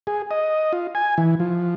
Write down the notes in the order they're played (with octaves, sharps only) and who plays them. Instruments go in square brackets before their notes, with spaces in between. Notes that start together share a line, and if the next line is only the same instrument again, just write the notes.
[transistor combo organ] G#4
D#5
F4
G#5
E3
F3